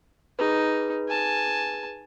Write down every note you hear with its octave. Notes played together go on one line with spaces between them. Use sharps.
D#4 G#4 B4
G#5 A5